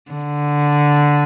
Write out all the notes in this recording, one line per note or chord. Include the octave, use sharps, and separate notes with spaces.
D3